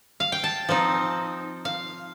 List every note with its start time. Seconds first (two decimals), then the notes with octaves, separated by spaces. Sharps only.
0.20 F5
0.32 G5
0.44 A5
0.69 F3 C4 D#4
1.65 F5